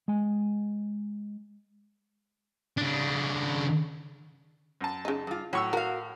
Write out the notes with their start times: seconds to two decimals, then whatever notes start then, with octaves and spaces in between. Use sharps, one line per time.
0.08 G#3 G#5
2.78 C#3 D4
4.81 F#2 A5
5.05 C#3 D#4
5.27 G2 F4
5.53 A2 F#3 C#6 E6
5.73 F#4 A#4 F5